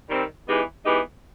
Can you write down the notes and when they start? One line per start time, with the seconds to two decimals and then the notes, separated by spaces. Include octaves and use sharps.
0.10 D#3 G3 C4
0.48 E3 G#3 B3 D#4 G4
0.86 E3 G#3 B3 D#4 G4